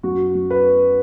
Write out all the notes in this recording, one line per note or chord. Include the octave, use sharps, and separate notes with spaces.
F#2 F#4
F#3
B4